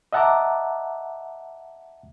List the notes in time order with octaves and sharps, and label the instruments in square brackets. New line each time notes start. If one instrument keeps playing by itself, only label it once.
[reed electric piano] D#5 E5 F#5 A5 A#5 D6